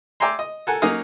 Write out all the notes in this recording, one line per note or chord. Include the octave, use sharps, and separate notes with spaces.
D5 E5 G5 G#5 A#5 C6
D#5
A4 A#4 F#5 G#5
F#3 A#3 C#4 D#4 D#5 F5